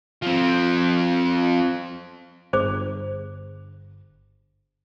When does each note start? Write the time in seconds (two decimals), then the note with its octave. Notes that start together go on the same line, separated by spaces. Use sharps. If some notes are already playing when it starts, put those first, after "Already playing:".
0.22 F3 C4
2.53 G1 G#4 C5 D6